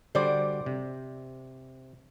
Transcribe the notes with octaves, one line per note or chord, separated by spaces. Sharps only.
D3 G3 F#4 C5 D5
C3